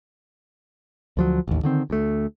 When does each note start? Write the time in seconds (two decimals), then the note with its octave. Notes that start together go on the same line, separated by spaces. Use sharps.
1.17 D2 F3 F#3
1.48 A1 D#2
1.63 D3 D#3 C4
1.90 D2 A3